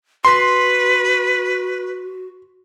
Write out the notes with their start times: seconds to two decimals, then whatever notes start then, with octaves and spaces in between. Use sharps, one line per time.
0.25 F#4 B4 C6